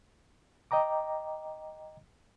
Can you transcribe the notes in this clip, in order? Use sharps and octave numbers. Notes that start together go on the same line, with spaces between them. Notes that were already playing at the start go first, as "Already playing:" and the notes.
D#5 G5 A#5 D6